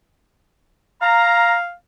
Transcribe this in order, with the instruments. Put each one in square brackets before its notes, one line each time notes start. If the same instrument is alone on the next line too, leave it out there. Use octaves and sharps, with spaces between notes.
[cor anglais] F5 [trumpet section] A#5